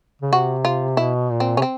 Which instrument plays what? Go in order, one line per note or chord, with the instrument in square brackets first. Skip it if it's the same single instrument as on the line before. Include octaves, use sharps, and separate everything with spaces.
[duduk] C#3
[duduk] C3 [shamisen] F#4
[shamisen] F4
[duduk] B2 [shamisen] E4
[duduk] A#2
[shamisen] C4
[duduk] C3 [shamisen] C#4
[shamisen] C4